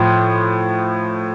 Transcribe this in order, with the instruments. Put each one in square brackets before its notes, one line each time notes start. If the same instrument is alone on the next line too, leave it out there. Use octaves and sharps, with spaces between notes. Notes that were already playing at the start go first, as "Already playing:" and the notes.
Already playing: [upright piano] A2 F3 C6